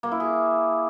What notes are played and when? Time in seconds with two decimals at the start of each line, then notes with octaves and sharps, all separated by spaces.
0.03 A#3
0.12 E4
0.20 G#4